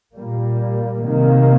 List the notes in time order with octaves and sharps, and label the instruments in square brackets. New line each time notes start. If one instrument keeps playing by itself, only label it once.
[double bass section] A#2 G3 A#3
C3 D#3 A#3